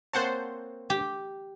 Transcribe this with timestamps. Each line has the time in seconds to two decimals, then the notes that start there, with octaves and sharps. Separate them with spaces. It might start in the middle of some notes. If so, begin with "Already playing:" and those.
0.13 A#3 C4 C5 C#5 F#5 A5
0.90 G4